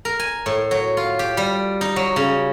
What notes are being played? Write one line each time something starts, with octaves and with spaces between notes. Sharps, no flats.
A#4
G#5
A2
F#3
F4
G4
G3
D#4
F#3
C#3